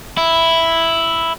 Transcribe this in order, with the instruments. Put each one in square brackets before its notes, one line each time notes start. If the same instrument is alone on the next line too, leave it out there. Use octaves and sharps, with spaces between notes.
[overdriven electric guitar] E4